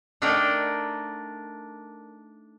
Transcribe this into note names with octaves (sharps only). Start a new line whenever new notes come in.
A3 D4 D#4 A#4 D5 G5